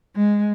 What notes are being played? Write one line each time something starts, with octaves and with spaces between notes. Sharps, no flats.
G#3